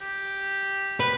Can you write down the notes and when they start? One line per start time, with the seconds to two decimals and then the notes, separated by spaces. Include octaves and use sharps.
0.01 G4
1.00 B4